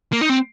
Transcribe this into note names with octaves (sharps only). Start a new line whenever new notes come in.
A#3
D#4
C4